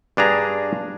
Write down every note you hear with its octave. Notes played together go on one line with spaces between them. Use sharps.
G2 D4 G#4 A#5